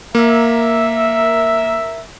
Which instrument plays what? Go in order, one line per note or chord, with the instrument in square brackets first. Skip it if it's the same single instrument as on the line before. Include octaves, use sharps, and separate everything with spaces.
[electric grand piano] A#3 [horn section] A#4 E5